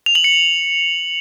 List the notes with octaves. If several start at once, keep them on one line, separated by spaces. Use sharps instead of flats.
F7
F#7
C#7